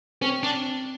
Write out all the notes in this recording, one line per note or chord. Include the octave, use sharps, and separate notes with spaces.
C4 C#4
D4